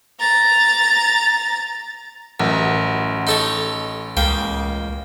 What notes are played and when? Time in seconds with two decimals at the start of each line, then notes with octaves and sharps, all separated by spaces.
0.20 A#5 A6
2.40 A1 F#2
3.27 D#4 A4 C#5
4.17 C#2 A#3 G5